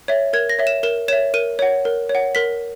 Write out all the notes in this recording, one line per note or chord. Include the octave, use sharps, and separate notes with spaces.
C#5 E5
A#4 G#6
A#6
C#5 E5
E7
A#4 E7
C#5 E5 E7
A#4 D#7
C#5 F#5
A#4
C#5
F#5
A#4 B6